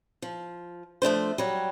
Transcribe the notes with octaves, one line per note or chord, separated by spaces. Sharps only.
F3
F3 A3 D4 C5
F#3 G3